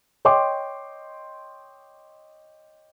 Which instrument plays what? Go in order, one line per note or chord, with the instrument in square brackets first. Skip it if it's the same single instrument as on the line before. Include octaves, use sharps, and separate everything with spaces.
[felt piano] C#5 D#5 G5 C6 D6